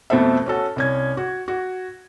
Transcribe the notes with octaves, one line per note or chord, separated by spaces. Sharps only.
F2 B2 A3 A4 C5 E5
C#4 F#4 A4
C2 C#4 G#6
F#4
F#4